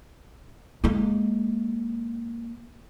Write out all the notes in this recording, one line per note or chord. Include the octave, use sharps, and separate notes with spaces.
G#3 A#3